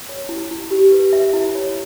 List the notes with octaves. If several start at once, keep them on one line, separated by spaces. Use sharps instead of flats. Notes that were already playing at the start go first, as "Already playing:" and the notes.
C#5
E4
E4
G4
B4
E5
E4
C#5